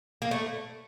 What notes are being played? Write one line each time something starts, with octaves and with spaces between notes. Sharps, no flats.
A#3
A3